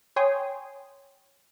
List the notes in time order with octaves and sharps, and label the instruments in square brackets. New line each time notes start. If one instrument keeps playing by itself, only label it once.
[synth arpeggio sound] C#5 G5 G#5 C6 D#6